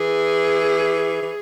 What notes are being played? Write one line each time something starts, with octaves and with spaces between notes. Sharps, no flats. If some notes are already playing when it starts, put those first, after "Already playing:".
Already playing: E3 G#4
E3